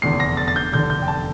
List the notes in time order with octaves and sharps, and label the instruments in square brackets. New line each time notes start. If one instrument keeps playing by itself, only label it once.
[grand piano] F1 E2 D3 C7
A#6
A6
A6
G6
F1 E2 D3 G6
G6
G5
A5